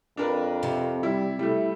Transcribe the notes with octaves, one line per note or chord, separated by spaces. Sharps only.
F2 D4 A#4 B4
C3
G3 E4
G3 A3 E4